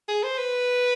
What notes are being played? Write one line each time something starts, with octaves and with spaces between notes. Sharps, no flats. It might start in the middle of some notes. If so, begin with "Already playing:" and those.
G#4
C5
B4